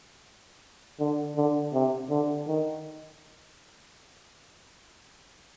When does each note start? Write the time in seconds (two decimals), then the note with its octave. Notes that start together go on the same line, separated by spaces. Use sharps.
1.00 D3
1.36 D3
1.73 C3
2.10 D3
2.48 D#3